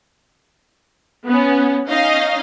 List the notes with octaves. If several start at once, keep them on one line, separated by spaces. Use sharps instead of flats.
B3 C#4
C#4 D#4 D#5 F5